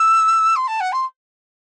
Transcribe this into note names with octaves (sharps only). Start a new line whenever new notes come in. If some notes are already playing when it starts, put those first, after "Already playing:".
Already playing: E6
C6
A5
F#5
C6